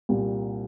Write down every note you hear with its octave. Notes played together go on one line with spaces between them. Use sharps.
C2 A#2 G3